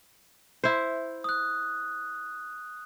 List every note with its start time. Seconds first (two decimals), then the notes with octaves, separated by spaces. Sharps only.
0.64 E4 C5
1.24 D#6 F#6